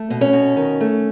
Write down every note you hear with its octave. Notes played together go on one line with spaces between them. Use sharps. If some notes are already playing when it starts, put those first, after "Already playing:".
Already playing: A3
B2
C#4
B2
D#3
A3